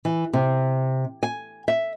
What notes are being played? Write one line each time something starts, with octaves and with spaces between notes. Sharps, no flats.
E3
C3
G#5
E5